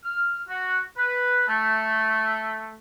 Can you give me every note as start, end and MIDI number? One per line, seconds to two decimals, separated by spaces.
0.04 0.39 89
0.48 0.80 66
0.97 1.45 71
1.48 2.76 57